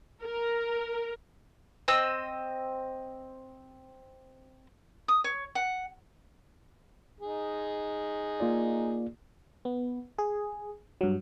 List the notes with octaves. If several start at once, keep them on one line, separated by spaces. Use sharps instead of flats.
A#4
C4 D#5 E6
D#6
C#5
F#5
D#4 G#4
A#3 F4 D5
B3
G#4
G2 F#3